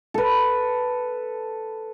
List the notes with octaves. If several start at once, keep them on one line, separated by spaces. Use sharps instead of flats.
A4 B4